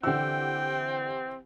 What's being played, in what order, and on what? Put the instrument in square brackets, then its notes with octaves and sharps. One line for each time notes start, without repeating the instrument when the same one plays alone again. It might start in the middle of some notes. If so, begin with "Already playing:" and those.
[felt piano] D3 E6 [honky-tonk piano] E3 G4 F#5 [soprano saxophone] C4 [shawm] G5